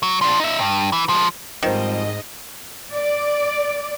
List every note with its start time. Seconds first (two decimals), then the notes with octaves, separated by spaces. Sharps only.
0.03 F#3
0.21 F3 D4
0.40 D#4 E5
0.59 G2
0.92 E3
1.09 F3 G#3
1.63 G#2 D#3 F3 G3 C4 D#5
2.93 D5